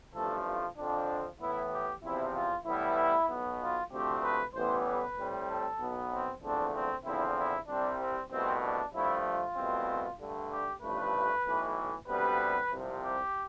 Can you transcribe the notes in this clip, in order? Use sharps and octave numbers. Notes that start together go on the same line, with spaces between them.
A1 G2 F3 A3 A4
F4
F2 D3 F3 C4 D4
A2 E3 B3 E4
G4
E2 C3 F3 C4 E4
F4
A2 E3 G3 B3 E4
B1 B2 B3
F4
D2 C3 F3 A3 C4 G4
B4
A1 A2 E3 G3 B3 C5
B4
A2 G3 C4
A4
B1 B2 B3
C4
E2 D3 F3 A3 C4 D4
C4
E2 D3 F3 C4 E4
E4
C2 C3 G3 C4 D4
C4
C2 B2 A3 C4
D4
G2 F3 A3 E4
F4
C2 B2 A3 C4
G2 D3 A3
G4
A1 G2 F3 A3 B4
B1 A2 E3
D2 C3 G3 B3 B4
C2 C3 F3
G4